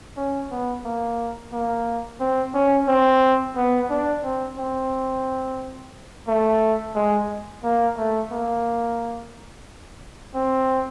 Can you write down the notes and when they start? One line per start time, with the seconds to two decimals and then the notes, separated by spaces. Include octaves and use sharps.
0.17 C#4
0.51 B3
0.84 A#3
1.52 A#3
2.20 C4
2.54 C#4
2.88 C4
3.56 B3
3.90 D4
4.24 C4
4.58 C4
6.28 A3
6.95 G#3
7.63 A#3
7.97 A3
8.31 A#3
10.35 C4